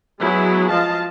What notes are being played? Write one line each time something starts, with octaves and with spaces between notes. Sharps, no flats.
F#3 G#3 B3 E4 G#4
F3 D#5 F5 A5